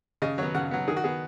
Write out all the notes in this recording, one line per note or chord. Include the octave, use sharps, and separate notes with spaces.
C#3 D#5
F#3 B3 C#5
C#3 F#5
F#3 B3
D#3 G#4
F#4
B3 G#4